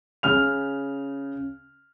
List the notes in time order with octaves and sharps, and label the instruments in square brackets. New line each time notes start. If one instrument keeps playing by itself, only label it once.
[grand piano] C#3 F6 F7